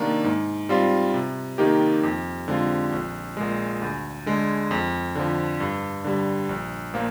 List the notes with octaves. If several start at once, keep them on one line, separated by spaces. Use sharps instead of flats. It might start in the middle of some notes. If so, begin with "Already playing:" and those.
Already playing: C3 D#3 A#3 D4
G#2
G3 C4 F4
C3
D#3 A#3 D#4 G4
F2
D3 G#3 C4 F4
A#1
A#2 G#3
D2
D3 G#3
F2
D3 F3
G2
D3 G3
A#1
A#2 F3 A#3